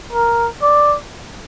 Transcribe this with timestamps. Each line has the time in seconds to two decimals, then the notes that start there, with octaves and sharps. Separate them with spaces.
0.13 A#4
0.62 D5